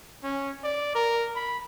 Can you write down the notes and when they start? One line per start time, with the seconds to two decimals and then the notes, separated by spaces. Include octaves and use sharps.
0.23 C#4
0.64 D5
0.95 A#4
1.36 B5